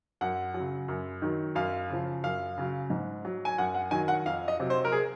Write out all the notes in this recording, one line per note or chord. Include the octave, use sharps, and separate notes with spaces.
F#2 F#5
F#3
C#3
F#2
D#3 F#3
F#2 F5
C#3 F3
F#2 F5
C#3 F#3
G#2
F#3
G#5
F#2 F#5
F#5
D#3 F#3 G#5
F#5
F2 F5
D#5
C3 F#3
C5
A#4
G#4